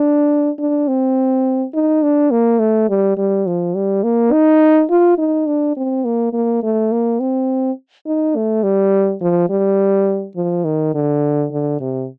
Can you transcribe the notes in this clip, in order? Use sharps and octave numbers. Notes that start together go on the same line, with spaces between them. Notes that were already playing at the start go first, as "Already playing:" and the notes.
Already playing: D4
D4
C4
D#4
D4
A#3
A3
G3
G3
F3
G3
A#3
D#4
F4
D#4
D4
C4
A#3
A#3
A3
A#3
C4
D#4
A3
G3
F3
G3
F3
D#3
D3
D3
C3